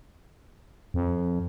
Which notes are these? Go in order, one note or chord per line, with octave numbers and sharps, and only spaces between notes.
F2